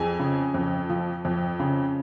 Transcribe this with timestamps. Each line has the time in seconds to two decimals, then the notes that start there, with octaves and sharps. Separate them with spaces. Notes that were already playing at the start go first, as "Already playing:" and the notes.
Already playing: F2 G#4 G#5
0.19 C#3
0.54 F2
0.89 F3
1.25 F2
1.60 C#3